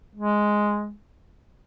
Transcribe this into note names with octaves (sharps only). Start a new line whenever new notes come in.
G#3